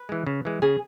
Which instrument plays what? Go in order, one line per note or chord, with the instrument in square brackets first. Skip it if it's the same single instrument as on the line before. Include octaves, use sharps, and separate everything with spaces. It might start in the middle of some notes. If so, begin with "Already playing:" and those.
Already playing: [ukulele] B4
[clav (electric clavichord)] E3 G#3
C#3
E3 G#3
[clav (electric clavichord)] C#3 [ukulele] G#4